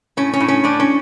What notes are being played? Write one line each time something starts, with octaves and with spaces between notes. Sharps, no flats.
A2 C#4
C#4
A2
C#4
A2 D4
C#4